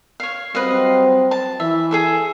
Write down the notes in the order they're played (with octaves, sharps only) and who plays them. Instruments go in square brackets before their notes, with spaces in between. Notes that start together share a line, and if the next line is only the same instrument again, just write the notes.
[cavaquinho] C#5 F5
[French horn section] F#3 G3 C4 [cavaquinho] B4 D#5 F5
[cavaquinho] A5
[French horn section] E3 [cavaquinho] E5
[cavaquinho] G#4 A4 E5